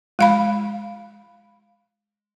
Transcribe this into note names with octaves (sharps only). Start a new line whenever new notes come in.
G#3 F5 B5